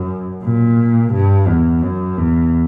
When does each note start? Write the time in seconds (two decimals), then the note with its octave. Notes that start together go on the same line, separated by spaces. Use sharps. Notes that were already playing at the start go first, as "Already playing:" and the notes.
Already playing: F#2
0.44 A#2
1.13 G2
1.48 E2
1.83 F#2
2.18 E2